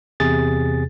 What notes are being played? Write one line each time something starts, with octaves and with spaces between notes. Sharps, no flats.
E2 C3 G#4 A6